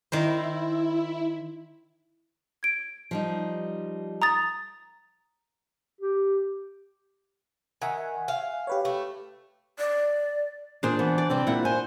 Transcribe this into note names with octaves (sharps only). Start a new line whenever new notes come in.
D#3 E4 A#4 C5
G#6 D7
F3 G3 D#4
A#5 D#6 A6
G4
D#3 E5 F#5 G#5
F5
G4 B4 C#5
A3
D5
A#2 D4 G#4 C5 D5
E3 B3
D5
C3 E3 G3 C4
A#2 G3 E4 F#5
C5 G#5